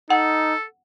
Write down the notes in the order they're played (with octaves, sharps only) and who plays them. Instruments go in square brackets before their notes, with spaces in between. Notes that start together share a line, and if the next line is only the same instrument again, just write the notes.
[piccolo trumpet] D#4 [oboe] A4 [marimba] F#5